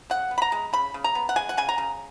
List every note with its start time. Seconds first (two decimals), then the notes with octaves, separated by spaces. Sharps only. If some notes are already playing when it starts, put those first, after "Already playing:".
0.10 C#3 F#5
0.31 B3
0.38 B5
0.42 A#5
0.52 G#3
0.73 C#3 B5
0.94 C#3
1.04 A#5
1.15 B3
1.29 F#5
1.36 G#3 G#5
1.49 F#5
1.58 C#3 G#5
1.69 A#5
1.78 C#3